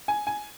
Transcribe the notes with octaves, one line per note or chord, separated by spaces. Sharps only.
G#5
G#5